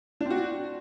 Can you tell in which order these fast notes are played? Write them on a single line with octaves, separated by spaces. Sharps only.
D4 C4 F#4